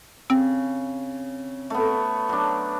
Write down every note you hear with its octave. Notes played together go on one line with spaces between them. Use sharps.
C#3 C4
A3 B3
F#3 D4